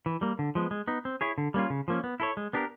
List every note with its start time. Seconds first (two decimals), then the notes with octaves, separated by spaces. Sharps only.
0.06 E3
0.21 G3 A#3
0.39 D3
0.55 F3 G#3 B3
0.71 G#3
0.88 B3 D#4
1.05 C4
1.21 E4 G#4 C#5
1.38 D3
1.54 G3 A#3 C#4 F4
1.70 C#3
1.88 F3 A#3 C#4
2.04 B3
2.20 E4 A4 C#5
2.37 G#3
2.53 B3 D4 G4 A#4